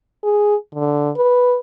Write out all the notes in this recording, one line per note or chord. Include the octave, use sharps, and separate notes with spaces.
G#4
D3
B4